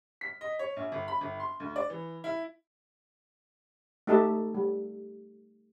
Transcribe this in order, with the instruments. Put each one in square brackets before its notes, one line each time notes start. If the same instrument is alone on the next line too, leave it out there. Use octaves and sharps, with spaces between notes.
[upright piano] B6
D#5
C#5
A#1
G1
B5
G1
C6
D2
D5
E3
E4
[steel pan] A3 D#4 G4 D#5 E5 A5
G3